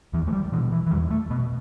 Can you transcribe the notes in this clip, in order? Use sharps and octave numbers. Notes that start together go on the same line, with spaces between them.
E2 E3
A3
G3
B2 E3
E3
E3
E2 G3
A3
B2 B3